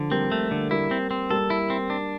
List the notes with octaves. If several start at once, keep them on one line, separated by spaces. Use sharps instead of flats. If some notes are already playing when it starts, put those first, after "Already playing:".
Already playing: D3 F3
G3 A#3 C4
A3
D3
G3 A#3 E4
C4
C4
G3 A#3 A4
E4
C4
D4